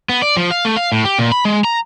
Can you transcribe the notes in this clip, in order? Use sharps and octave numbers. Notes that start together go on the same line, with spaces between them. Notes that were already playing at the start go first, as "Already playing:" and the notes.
B3
D5
F3
F5
A3
F5
A2
G4
A#2
B5
G#3
A#5